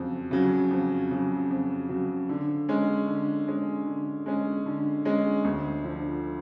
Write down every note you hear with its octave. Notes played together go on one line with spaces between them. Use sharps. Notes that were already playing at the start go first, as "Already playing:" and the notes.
Already playing: F2 C#3 F#3
C#3 F#3
F2
C#3 F#3
F2
C#3 F#3
D3
G#3 C#4
D3
G#3 C#4
D3
G#3 C#4
D3
G#3 C#4
D2
D3 F3